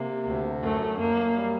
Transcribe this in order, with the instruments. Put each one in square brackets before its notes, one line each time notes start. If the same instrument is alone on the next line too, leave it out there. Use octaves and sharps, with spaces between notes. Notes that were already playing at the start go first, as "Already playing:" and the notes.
Already playing: [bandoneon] C3 [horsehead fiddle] A#3
[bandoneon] D2
[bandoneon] F#2 [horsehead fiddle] A3
[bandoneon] F#2 [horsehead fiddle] A#3
[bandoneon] G3